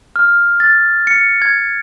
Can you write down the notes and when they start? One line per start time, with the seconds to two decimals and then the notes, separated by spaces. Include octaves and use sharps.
0.16 F6
0.60 A6
1.07 C#7
1.42 G#6